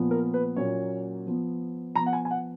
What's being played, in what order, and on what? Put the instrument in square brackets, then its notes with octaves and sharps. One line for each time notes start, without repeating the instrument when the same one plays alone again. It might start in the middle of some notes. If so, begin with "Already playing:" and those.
Already playing: [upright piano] A#2 F3 B3
A#4
B4
A#2 F#3 A#3 C#4 C#5
F3 B3
F3 A#5
B3
F#5
G#5
G#5
F#5